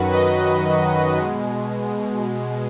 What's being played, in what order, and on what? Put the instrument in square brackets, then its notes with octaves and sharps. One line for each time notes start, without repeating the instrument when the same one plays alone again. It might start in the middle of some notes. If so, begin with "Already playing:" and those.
Already playing: [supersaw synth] F#2 D#3 F#3 F#4 B4
B4 D#5
B2 G#3